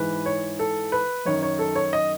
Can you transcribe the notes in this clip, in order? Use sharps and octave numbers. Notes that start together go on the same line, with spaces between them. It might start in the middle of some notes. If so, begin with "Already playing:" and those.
Already playing: G#2 E3 B4
C#5
A4
B4
F#2 D#3 C#5
C#5
A4
C#5
D#5